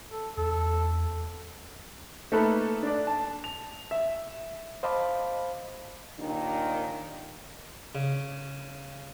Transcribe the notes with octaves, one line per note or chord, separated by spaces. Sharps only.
A4
E2 A4
A3 A#3 D#4 A4 B4
D4 D5
A5
F7
E5
C5 D#5 F5 A5 B5 D6
D#2 A#2 D#3 D4 D#4
C#3